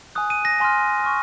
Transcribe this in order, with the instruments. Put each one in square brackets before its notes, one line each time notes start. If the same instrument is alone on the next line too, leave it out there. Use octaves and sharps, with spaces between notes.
[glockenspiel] G#5 D#6 F#6
D#7
A#6
G#5 C6 F6
C#6 F6